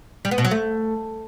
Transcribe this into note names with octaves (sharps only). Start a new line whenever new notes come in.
G3
B3
B2
F#3
A3